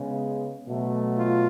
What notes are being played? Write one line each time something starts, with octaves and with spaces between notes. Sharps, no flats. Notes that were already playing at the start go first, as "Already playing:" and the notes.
Already playing: C#3 G#3 B3
B2 F#3 A3
F4